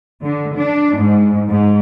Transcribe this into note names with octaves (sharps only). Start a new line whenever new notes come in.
D3
D4
G#2
G#2